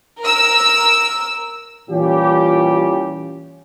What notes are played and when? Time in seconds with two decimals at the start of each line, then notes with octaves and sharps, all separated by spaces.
0.21 A#4 E6
1.90 A#2 E3 G3 C#4 F4 G4